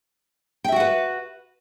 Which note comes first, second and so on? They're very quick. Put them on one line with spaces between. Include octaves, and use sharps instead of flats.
G5 E5 F#4 F#5 B4